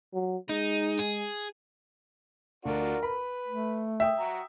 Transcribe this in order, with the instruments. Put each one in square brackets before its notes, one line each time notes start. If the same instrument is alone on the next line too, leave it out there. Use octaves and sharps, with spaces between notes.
[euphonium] F#3
[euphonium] G#3 [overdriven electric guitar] D#4
[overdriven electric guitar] G#4
[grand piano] D2 [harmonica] D4 F4 F#4 [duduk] A#4
[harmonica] B4 [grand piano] B5
[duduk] A3
[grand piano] E5 G5 D#6
[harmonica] F#4 A#5